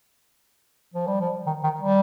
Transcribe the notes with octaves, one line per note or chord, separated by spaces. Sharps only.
F3
G3
F3
D#3
D#3
G3